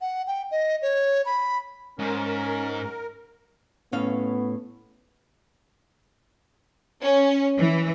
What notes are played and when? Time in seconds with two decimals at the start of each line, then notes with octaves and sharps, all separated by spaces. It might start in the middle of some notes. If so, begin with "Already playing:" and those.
0.01 F#5
0.27 G5
0.51 D#5
0.82 C#5
1.26 B5
1.99 G#2 C#4 A#4
3.93 A2 B3 C#4 F5
7.02 C#4
7.58 E3